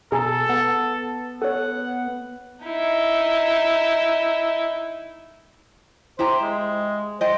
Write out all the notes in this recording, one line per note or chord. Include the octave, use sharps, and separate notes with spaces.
B2 G#4 A4 G#5 A#5
B3 F#5
A4 C#5 F#5
D#4 E4
E4 G4 C5 A#5
G#3
C5 D#5 G5